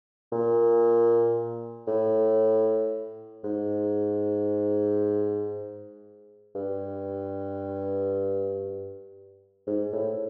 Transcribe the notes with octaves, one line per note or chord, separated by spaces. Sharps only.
A#2
A2
G#2
G2
G#2
A2